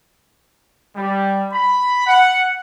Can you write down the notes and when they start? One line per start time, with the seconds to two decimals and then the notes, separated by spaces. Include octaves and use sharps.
0.96 G3
1.53 B5
2.07 F#5